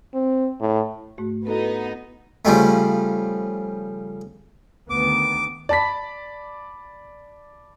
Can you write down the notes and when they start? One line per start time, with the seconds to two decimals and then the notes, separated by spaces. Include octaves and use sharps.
0.14 C4
0.60 A2
1.18 G#2 A3 F#4
1.47 B3 D#4 E4 F#4 A4
2.45 C#3 F3 G3 A3
4.90 D2 D#3 B3 D6
5.69 D5 A5 B5 B6